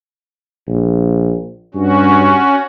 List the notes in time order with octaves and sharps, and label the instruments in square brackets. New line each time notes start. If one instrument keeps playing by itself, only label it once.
[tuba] A#1
[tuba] G2 [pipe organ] C#4 F#4